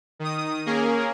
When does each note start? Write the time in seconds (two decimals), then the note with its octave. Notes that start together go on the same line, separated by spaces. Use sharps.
0.19 D#3 D#6
0.66 A#3 C#4 G#4 A#4